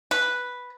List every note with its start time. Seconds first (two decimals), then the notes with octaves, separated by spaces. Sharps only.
0.11 B4